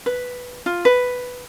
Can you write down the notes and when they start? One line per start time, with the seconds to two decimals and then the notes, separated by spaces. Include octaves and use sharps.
0.06 B4
0.66 F4
0.85 B4